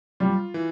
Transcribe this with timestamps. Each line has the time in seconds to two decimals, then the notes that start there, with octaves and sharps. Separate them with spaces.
0.20 G3 F4
0.54 E3